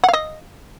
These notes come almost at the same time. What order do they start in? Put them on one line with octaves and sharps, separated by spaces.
F#5 F5 D#5